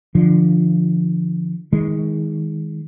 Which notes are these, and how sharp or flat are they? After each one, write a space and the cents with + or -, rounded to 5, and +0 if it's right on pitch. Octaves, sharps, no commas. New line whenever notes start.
D3 +15 F3 -15
D#3 +30 G#3 +0